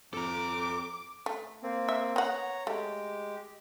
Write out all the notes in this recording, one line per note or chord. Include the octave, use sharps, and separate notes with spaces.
F2 A4 A#5 D6
A3
A#3 C4
E5
B3 C#5 F#5 A#5
G#3 A3 G4